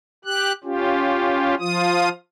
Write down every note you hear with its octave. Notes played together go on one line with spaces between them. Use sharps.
G4 F#6
C#4 F4 G4
F3 F4 D#6